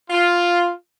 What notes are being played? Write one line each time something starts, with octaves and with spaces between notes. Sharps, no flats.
F4